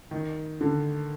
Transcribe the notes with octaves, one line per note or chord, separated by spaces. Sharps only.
D#3
D3